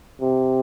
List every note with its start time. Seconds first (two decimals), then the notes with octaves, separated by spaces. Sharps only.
0.22 C3